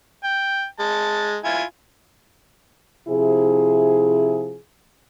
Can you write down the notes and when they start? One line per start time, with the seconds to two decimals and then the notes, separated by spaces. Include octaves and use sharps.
0.24 G5
0.80 G#3 A5
1.45 E4 F4 G#5
3.08 C3 F3 E4 G#4